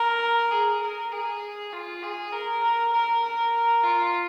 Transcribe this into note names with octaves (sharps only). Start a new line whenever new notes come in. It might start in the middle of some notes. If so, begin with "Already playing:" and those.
Already playing: A#4
G#4
A#4
G#4
F4
G#4
A#4
A#4
A#4
A#4
F4